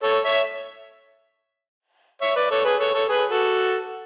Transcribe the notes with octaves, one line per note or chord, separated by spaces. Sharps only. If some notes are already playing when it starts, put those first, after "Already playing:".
A4 C#5
C#5 E5
C#5 E5
B4 D5
A4 C#5
G#4 B4
A4 C#5
A4 C#5
G#4 B4
F#4 A4